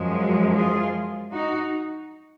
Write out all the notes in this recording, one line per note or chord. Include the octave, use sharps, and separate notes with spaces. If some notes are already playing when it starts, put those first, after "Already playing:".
Already playing: F#2 F3 G#3
F4 G#4
D#4 F#4